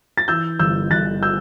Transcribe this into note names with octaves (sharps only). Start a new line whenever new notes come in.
A6
E3 E6 G6
G1 E6 G6
G1 F#6 A6
E6 G6